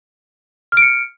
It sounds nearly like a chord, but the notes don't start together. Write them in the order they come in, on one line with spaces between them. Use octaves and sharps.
F6 D7 C#7